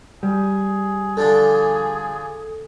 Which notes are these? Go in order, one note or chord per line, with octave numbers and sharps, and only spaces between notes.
G3 G#4
D3 F3 D4 A4